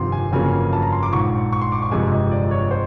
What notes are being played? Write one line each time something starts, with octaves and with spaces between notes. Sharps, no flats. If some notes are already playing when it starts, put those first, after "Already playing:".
Already playing: G1 F2 C3 D#3 C6
G#5
G1 F2 C#3 F#3 A#3 G#5
A5
A#5
C6
D6
A#1 G#2 F3 C#6
C#6
C6
D6
C#6
G1 F2 C3 F3 G#3 G#5
D#5
D5
C#5
C5